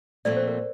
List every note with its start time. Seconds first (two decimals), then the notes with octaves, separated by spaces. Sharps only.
0.25 A#2 F3 A3 C4 D5
0.37 C5
0.48 A#4